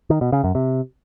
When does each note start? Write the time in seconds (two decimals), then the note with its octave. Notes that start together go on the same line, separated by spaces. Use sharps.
0.10 D#3
0.21 B2
0.32 C#3
0.44 F#2
0.55 C3